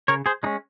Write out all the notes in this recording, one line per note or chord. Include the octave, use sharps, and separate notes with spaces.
C#3 A#4 C#5
G#4 C5
G#3 C#4 D#4